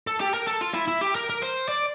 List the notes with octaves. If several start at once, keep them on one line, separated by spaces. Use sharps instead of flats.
A4
G4
A#4
A4
F4
E4
E4
G4
A#4
A#4
C5
D5